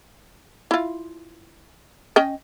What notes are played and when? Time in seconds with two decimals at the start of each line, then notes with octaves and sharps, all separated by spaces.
0.71 E4 F4
2.16 C#4 D#5 G5